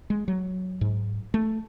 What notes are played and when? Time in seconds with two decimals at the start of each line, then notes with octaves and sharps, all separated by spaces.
0.10 G#3
0.28 F#3
0.81 G#2
1.34 A3